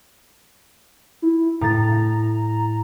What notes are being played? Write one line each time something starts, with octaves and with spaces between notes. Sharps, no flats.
E4
A2 A#5 A6